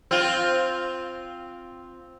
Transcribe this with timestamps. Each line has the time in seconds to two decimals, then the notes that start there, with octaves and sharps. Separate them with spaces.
0.11 C4 F4